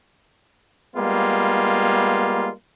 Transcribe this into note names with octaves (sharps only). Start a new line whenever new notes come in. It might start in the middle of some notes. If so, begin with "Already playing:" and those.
G3 G#3 A#3 B3 F4